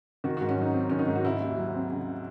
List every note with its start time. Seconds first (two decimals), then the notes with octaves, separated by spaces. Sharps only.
0.24 D#3 F#4
0.37 F#4
0.41 G#2
0.49 C#4
0.57 F#3 D#4
0.74 C4
0.90 D#3 C#4
0.99 D#4
1.08 G#2
1.16 F#4
1.24 C#3 E4
1.40 D#2
1.58 F#3
1.75 C4
1.90 C#3